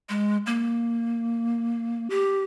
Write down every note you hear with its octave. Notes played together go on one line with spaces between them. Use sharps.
G#3
A#3
G4